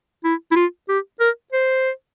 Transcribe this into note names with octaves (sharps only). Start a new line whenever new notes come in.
E4
E4
F4
G4
A#4
C5